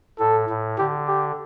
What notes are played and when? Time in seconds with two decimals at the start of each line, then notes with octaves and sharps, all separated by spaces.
0.19 A2 A4
0.49 A2
0.78 D3 G4
1.08 G4